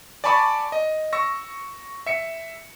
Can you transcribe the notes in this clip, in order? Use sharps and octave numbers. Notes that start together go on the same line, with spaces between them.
D5 G#5 A5 B5 C#6 D6
D#5
C#6 E6 A#6
E5 C#7